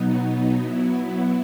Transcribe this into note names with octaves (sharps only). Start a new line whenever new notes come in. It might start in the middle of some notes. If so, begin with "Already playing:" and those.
Already playing: B2 F#3 B3 D#4
F#3 B3 E4